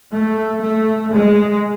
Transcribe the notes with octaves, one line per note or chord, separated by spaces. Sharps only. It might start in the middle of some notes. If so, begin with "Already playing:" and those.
A3
A3
G#3